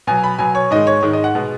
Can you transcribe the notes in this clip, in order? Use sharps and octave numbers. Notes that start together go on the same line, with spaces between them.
B2 F#3 G#5
B5
B2 F#3 G#5
C#5
G#2 D#3 G#3 D#5
C#5
G#2 D#3 G#3
D#5
F#5
B2 G#3